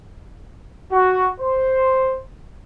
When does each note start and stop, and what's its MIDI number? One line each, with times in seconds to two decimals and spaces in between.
0.92 1.28 66
1.40 2.18 72